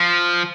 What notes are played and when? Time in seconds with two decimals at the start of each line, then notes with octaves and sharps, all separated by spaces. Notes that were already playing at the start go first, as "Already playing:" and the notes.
Already playing: F3